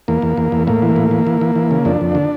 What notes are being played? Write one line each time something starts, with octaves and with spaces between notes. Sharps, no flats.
E2 A#3
E2
E2
E2
A2 A#3
E3
A2
E3
E3
E3
E3
C#3
F2 D4
F2
D3